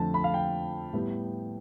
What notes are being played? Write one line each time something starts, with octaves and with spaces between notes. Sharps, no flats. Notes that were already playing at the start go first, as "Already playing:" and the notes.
Already playing: F2 D3 F3 A3 A5
B5
F5
G5
A2 G3 B3